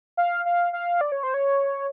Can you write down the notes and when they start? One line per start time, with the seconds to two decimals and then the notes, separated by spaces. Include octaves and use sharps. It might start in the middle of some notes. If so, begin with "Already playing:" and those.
0.17 F5
0.45 F5
0.73 F5
1.01 D5
1.12 C#5
1.23 C5
1.34 C#5